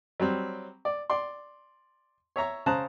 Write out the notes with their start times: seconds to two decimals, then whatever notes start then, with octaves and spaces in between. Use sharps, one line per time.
0.20 F#3 G3 C4
0.85 D5
1.10 D5 C6
2.36 C#5 E5 A#5 C#6
2.66 C#3 C5 A5 A#5 D#6 F#6